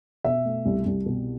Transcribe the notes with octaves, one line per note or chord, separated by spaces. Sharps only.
B2 E5
A3
C2
C2
B2